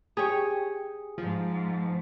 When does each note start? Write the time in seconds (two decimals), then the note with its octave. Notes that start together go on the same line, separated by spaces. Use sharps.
0.17 G4 G#4 C#5
1.18 G#2 F3